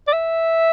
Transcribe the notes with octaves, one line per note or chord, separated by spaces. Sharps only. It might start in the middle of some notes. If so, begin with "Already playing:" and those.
D5
E5